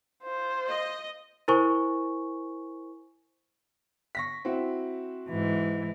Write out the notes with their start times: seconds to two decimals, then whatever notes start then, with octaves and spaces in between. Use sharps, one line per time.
0.23 F4 C5
0.69 D#5
1.48 E4 A#4 C5 G#5 C#6
4.15 C#6 A#6 B6
4.45 C4 E4 F#4
5.30 G#2 E3